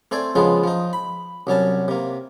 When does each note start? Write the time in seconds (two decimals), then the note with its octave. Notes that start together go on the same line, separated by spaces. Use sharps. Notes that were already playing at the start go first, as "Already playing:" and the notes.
0.11 A3 C4 C5 D5 G#5
0.35 C#3 F3 G#3 B3 F4 C5
0.64 F3 D#4
0.93 B5
1.47 C2 F#3 C#4 A5
1.88 C3 A#3